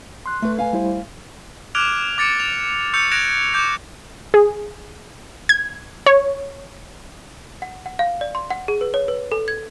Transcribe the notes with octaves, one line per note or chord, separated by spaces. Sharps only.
C6 F#6
A3 B4
B4 F5 G#5
G3 E4 C5
D6 F6 F#6 G#6 D7 F7
D6 A6 C#7 D7
F7
C#6 E6 G6 C#7 F7
F#6 G#6 A#6 D7 E7 F7
D6 G6 C#7
G#4
G#6
C#5
F#5
F#5
F5
D5
C6
F#5
G#4
B4
C#5
B4
A4
G#6